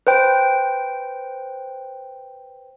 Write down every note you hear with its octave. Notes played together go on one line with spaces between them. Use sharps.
B4 C5 G5